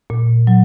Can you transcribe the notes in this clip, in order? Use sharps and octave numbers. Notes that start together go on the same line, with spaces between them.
A#2
F#3